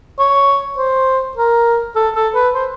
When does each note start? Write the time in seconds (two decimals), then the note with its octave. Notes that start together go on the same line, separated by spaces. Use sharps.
0.19 C#5
0.77 C5
1.37 A#4
1.96 A4
2.15 A4
2.35 B4
2.55 C5